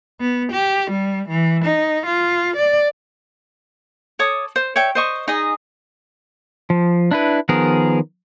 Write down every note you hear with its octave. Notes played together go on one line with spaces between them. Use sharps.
B3
G4
G3
E3
D#4
F4
D5
A4 C#5 D6 D#6
C5
C#5 E5 G5
C5 D#5 C#6
D#4 G#4 D#5
F3
D4 E4 B4
D#3 F3 B3 G#4 A#4